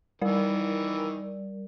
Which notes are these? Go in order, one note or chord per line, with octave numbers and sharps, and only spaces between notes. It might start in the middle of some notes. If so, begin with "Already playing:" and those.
D#3 E3 G3 A#4 D5